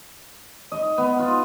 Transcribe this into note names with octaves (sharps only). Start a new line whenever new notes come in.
D#5
B3
F4